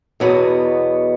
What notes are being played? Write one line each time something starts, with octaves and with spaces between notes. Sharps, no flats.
E2 B2 F#3 B3